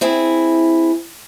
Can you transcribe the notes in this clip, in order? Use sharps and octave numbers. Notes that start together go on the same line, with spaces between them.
C4 E4 G#4